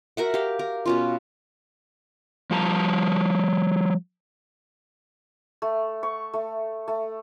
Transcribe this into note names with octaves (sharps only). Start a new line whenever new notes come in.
F#4 A#4 E5 F#5
G4 F5
A#4
B2 C#4 F4
F3 G3 A5 A#5
A3
C#6
A3
A3